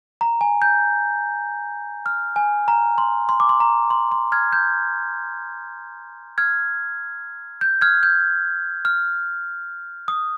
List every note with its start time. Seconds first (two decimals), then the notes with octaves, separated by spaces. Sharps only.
0.21 A#5
0.41 G#5
0.62 G6
2.06 F6
2.36 G#5
2.68 A#5
2.98 C6
3.29 C6
3.40 D6
3.49 C6
3.60 A#5
3.91 C6
4.12 C6
4.32 F6 G#6
4.53 G6
6.38 F6 G#6
7.61 G6
7.81 F6 G#6
8.03 G6
8.85 F6
10.08 D#6